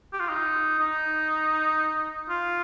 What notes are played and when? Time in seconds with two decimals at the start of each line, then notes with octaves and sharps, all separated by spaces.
0.13 G4
0.20 F4
0.29 D#4
0.79 D#4
2.29 F4